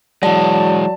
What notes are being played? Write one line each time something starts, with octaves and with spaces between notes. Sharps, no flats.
E3 F#3 G#3 D5 A5